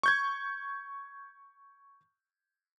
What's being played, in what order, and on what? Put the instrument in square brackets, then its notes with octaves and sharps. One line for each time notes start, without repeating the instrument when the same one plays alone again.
[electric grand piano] C#6 G6 G#6